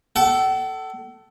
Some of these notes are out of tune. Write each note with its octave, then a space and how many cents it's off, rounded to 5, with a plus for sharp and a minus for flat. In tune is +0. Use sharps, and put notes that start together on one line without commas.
A4 +0 F#5 +45